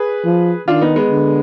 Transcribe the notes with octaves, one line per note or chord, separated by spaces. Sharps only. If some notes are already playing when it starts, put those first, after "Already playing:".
Already playing: G#4 B4
F3
D#3 D4 F4
B3 D#4
G#3 B3
D3